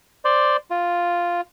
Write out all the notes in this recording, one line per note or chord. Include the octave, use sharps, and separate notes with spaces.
C5 D5
F4